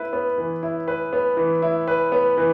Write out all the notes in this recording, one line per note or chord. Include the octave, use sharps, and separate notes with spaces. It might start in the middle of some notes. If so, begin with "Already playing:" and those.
Already playing: E4 B4
B3
E3
E4
B4
B3
E3
E4
B4
B3
E3